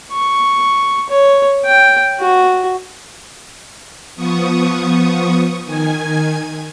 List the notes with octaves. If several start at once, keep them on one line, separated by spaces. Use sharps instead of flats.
C#6
C#5
G5
F#4
F3 B3 C#6 D#6
D#3 G#5 G#6